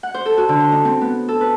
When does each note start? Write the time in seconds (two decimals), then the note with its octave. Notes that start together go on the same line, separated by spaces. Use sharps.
0.03 F#5
0.14 C5
0.26 A4
0.37 F#4
0.49 D3
0.60 C5
0.72 D#4
0.85 C4
1.01 B3
1.28 A4
1.41 B4